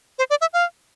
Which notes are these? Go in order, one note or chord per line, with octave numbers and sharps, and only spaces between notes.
C5
D5
E5
F5